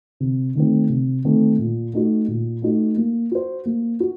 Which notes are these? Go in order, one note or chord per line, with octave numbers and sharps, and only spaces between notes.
C3
D#3 A3 C4
C3
D#3 A3 C4
A#2
A3 D#4 F#4
A#2
A3 D#4 F#4
A#3
F#4 C5
A#3
F#4